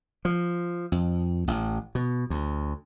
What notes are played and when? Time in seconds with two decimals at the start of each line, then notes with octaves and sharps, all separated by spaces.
0.25 F3
0.92 F2
1.48 A1
1.95 B2
2.30 D2